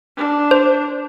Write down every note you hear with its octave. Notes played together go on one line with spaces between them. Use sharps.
D4
C5